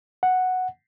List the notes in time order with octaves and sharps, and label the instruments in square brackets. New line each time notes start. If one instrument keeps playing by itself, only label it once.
[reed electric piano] F#5